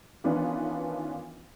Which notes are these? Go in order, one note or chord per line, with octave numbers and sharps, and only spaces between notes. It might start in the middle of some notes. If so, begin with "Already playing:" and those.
D#3 E3 B3 C#4 D4 F4